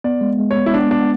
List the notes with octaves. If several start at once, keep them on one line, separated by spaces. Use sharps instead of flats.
B3 D5
G#3
G#3
C#5
B3
E4
B3 D4
B3 D4